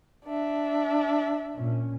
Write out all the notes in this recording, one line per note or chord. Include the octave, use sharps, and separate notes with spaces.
D4 E5
A#2 C#4